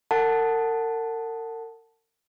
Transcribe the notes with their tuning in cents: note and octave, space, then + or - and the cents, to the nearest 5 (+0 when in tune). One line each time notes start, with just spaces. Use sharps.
A#4 -45 F#5 +0 A5 +0